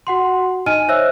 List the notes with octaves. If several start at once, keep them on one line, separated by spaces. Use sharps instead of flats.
F#4 F#5 C6
D#4 D#5 G#5 F6 D#7
C5 C#5 E5 E6 F#6